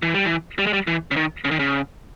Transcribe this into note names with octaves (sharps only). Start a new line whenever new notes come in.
E3
G3
E3
G3
G#3
G3
E3
C#3
D#3
C#3
D#3
C#3